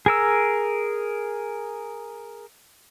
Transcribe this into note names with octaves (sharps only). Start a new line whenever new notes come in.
G#4 A#4 E6